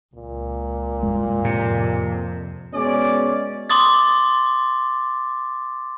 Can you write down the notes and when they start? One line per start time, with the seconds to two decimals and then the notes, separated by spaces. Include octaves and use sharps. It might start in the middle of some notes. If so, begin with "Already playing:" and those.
0.15 C#2 A#2
1.03 C2 F#2 G#3
1.44 F2 A2 C3
2.74 B2 G#3 C#4 D5
3.70 C6 D6 D#6 A6